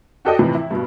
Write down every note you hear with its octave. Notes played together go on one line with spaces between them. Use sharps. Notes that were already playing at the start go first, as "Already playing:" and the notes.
F#4 G4 A4 D5 D#5 G5
A2 C3 E3 F3
E4
G2 B2